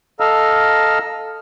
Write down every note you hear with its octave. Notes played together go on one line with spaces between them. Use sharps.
A4 D#5 F5 A#5 E6 F6